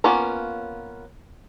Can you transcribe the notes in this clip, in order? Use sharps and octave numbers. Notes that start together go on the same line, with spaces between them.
A#3 B3 C#4 F4 C#5